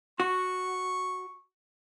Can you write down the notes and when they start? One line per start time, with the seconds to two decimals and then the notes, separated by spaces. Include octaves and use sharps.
0.20 F#4 C#6